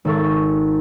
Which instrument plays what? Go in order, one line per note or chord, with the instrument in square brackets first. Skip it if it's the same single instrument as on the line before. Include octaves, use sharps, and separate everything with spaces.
[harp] G#1 A4 C#6